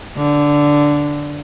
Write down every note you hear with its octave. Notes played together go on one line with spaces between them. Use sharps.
D3